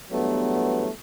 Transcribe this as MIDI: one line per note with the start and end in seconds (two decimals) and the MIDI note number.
0.11 0.89 40
0.11 0.89 43
0.11 0.89 54
0.11 0.89 57
0.11 0.89 59